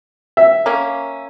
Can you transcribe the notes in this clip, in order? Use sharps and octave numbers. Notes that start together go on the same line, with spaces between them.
E5
A#3 C#4